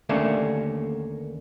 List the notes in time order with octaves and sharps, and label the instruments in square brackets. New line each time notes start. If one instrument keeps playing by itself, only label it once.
[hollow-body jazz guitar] D#2 D3 A3 A#3 C#4